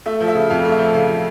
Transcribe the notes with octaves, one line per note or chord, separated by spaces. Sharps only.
A3 E5
F3
E5
C#3
F2 F5
A3
E5
F3
C#3 F5